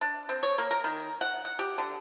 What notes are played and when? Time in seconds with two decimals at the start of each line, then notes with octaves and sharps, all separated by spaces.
0.01 D4
0.29 C4
0.43 C#5
0.58 A#3
0.71 A#4
0.84 D#3
1.21 F#5
1.45 F#5
1.59 G4
1.78 D3